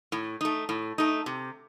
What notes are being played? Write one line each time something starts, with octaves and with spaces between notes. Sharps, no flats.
A2
A3 D#4
A2
A3 D#4
C3